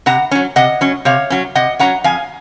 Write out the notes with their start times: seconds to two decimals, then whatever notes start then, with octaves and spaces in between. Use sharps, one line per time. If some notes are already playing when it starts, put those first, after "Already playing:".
0.06 C3 F#5 A#5
0.31 F#3 C#4
0.56 C3 D#5 F#5
0.81 F#3 C#4
1.05 C3 C#5 F5
1.30 F#3 C#4
1.55 C3 D#5 F#5
1.79 F#3 C#4 F#5 A#5
2.04 F2 F5 G#5